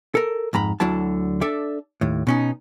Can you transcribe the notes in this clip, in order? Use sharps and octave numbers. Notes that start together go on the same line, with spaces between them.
A4 A#4
F2 G#2 A#5 B5
D2 D3 F#3 E4 A5
D4 A4 D5 E5
D#2 A2
B2 C#4 D#4